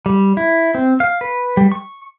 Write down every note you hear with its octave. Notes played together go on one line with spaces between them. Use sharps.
G3
E4
C4
F5
B4
G3
C#6